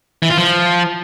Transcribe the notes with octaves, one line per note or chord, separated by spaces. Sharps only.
E3
F4
F3